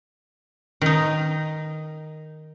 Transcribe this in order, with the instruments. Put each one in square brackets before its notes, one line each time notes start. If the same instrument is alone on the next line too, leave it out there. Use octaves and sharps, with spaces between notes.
[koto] D#3 D#4